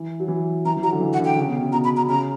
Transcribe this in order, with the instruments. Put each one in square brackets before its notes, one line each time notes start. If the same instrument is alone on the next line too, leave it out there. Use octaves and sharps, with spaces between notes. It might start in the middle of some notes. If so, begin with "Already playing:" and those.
Already playing: [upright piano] E3
F#3
E3
[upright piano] E3 [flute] A#5
[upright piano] E3
[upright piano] F#3 [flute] A#5
[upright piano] D3
E3
[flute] F#5
[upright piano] D3
[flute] G5
[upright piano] C#3
B2
C#3
[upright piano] B2 [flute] A#5
[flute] B5
A#5
[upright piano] C#3 [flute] A#5